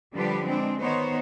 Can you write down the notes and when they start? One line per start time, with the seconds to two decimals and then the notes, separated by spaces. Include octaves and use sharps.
0.13 D3 F3 G3 D4 G4 B4
0.43 G#3 C4 D4
0.81 D#3 B3 D#4 C5 C#5